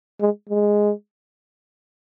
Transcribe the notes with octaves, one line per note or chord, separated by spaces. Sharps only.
G#3
G#3